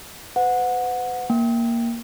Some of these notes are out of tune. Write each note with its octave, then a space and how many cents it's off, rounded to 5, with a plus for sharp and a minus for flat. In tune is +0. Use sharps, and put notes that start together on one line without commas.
B4 +35 F#5 -20
A#3 +0 G5 +0